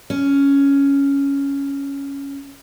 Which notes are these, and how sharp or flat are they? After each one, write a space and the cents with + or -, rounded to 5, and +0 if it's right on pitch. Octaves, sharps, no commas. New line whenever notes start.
C#4 +5